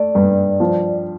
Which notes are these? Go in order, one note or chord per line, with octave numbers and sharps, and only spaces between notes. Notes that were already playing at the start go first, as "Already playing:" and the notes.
Already playing: A3 D5
G2
F3